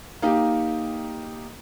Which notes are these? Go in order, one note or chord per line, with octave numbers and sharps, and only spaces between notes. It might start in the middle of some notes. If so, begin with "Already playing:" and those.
A#3 D#4 G4